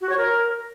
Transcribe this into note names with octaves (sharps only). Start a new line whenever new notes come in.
F#4
C#5
A#4